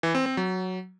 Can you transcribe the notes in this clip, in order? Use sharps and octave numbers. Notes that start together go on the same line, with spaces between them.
E3
C4
C4
F#3